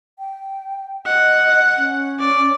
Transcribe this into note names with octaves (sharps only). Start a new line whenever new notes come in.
G5
D#5 F#5
C#4
D5